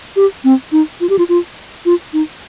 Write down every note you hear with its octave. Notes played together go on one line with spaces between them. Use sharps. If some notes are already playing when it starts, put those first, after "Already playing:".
G4
C4
D#4
F4
G4
F4
F4
F4
D#4